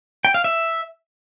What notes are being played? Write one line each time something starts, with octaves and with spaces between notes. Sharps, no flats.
G5
F5
E5